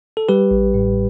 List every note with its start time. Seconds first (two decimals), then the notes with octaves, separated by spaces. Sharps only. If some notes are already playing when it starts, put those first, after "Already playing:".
0.17 A4
0.29 G3 G4 B4
0.51 A1
0.74 A2